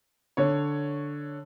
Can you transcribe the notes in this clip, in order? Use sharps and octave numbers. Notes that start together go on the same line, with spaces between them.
D3 C#5